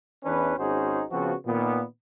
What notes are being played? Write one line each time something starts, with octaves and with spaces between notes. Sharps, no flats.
E2 E3 C#4 D4 B4
G#1 C#4 D#4 F#4 G#4 C5
C#3 F3 B3 C4 F#4
A#2 D#3 B3